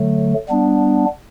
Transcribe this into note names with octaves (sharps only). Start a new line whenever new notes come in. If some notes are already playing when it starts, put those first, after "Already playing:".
Already playing: D3 F#3 A3
G3 B3 D4